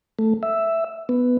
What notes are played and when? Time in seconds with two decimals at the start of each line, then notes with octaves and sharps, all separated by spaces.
0.19 A3
0.43 E5
1.09 B3